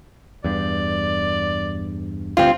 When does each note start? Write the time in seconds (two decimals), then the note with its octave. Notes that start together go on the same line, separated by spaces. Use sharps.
0.44 E2 G2 D5
2.37 D2 G2 C4 F4